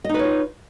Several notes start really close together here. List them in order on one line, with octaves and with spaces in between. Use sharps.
D#5 D#4 B4 C#5 F4